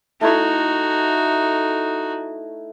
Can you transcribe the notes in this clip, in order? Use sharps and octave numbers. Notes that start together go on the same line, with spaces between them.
A3 D#4 E4 F#4 C#6